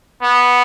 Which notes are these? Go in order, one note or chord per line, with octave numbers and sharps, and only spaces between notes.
B3